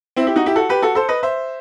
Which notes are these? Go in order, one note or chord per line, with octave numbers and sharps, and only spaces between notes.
C4 E4
E4 G4
D#4 F#4
E4 G4
F#4 A4
G4 B4
F#4 A4
A4 C5
B4 D#5
C5 E5